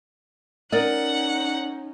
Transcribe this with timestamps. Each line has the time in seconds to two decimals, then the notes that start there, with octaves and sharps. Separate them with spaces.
0.72 C#4 D#4 A#4 D5 D#5 F#5